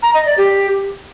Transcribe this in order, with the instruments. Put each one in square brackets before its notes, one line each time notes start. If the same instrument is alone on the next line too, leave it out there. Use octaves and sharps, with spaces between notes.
[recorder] A#5
D#5
D5
G4